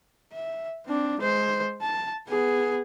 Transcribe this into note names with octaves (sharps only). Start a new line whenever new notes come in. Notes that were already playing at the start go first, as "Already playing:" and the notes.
E5
C4 D4
G#3 C5
A5
B3 G#4